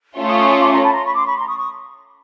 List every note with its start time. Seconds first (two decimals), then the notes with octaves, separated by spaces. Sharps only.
0.17 A3 C#4 F4
0.28 C#6 D#6
0.39 C#6 D#6
0.50 C#6 D#6
0.61 C6 D6
0.71 A#5 C6
0.82 A5 B5
0.93 A#5 C6
1.04 B5 C#6
1.14 C6 D6
1.26 B5 C#6
1.36 A#5 C6
1.47 C#6 D#6
1.58 C#6 D#6